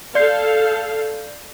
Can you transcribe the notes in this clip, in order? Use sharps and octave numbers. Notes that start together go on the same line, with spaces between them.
A4 D5 F5 G6 C7